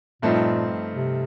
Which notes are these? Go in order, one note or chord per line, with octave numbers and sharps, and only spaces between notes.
G2 A#2 F3 A3 C4 D#4
C3